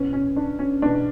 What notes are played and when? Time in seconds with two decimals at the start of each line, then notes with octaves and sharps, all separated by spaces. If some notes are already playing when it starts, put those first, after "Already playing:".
Already playing: E2 B2 C#4
0.13 C#4
0.36 D4
0.59 C#4
0.82 E2 B2 D4